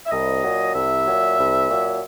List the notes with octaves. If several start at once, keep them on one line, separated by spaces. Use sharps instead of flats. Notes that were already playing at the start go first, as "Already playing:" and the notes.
E5
C2 D#5
A#2 F#3
C2 E5
A#2 F#3
C2
A#2 F#3